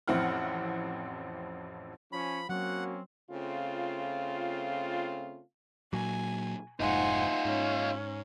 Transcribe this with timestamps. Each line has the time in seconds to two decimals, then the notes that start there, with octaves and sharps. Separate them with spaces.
0.08 A1 F2 C4 E4 F#5 F6
2.12 F3 C#4 B5
2.49 F#3 A#3 C4 C#4 F#4 F#5
3.30 C#3 A3 C4 F4
5.93 A#2 F#3 G#5
6.80 F1 G#2 D#4 F4 C5 F#5 G#5
7.45 G#2 C#4